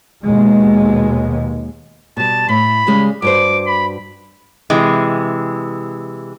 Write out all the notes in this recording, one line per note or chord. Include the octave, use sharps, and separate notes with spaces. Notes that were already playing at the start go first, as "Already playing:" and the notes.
D#2 B2 G#3
B2 G3 A5
A2 B5
C#3 G3 G#3
G2 F#4 C5 D6
B5
C3 E3 G#3